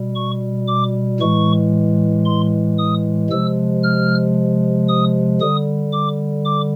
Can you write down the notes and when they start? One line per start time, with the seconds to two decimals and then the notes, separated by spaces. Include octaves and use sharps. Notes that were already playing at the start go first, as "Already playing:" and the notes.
Already playing: B2 G3
0.15 C#6
0.68 D6
1.20 A2 E3 G#3 C#6
2.26 C6
2.78 D#6
3.30 C3 F3 G#3 E6
3.83 F6
4.88 D#6
5.41 D3 G3 D#6
5.93 D6
6.45 D6